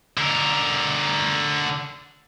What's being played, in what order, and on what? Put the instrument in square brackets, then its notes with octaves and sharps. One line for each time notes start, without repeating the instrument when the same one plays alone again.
[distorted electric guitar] D3 A#4